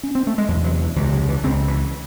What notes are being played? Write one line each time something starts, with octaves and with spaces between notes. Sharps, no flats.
C#4
C4
A3
G#3
E2 C3 F#3
F#3
E3
C#2 C3 E3
F#3
E3
C#2 C#3 C4
E3